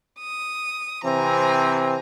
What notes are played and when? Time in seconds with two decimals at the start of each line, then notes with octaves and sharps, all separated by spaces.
0.20 D#6
1.04 C3 E3 C4 G#5 A#5